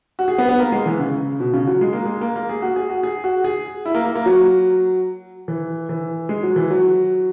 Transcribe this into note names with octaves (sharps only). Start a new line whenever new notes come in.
F#4
G#4
B3
B3
A#3
G#3
E3
C#3
B2
C#3
F#3
G#3
A#3
G#3
A#3
A#3
G#4
F#4
G#4
F#4
G#4
F#4
G#4
E4
A#3
A#3
A#3
F#3
E3
E3
G#3
F#3
E3
F#3